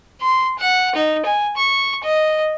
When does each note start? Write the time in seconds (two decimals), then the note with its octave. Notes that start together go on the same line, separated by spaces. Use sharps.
0.21 C6
0.58 F#5
0.95 D#4
1.25 G#5
1.57 C#6
2.03 D#5